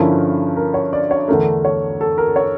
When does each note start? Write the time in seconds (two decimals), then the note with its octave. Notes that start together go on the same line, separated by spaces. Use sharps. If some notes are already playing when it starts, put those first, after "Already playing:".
Already playing: G2 D3 F3 C#4 E4 A#4
0.57 A#4
0.74 C#5
0.93 D5
1.11 C#5
1.28 E2 D3 A3 A#4
1.65 C#5
2.01 A4
2.18 A#4
2.36 C#5